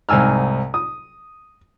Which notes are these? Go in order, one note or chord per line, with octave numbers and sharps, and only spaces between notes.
C2 G#2 G#5 E6 F6
D#6